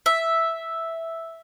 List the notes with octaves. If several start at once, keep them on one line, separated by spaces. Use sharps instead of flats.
E5